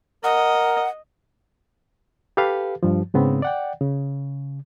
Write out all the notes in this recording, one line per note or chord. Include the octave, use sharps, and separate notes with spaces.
A#4 D#5 F#5
G4 A4 B4 F5
G2 F3
G#2 C#3 B3 C4
D5 F#5 G5
C#3